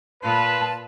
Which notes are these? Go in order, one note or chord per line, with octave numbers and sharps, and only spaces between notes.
A#2 F4 B4 A5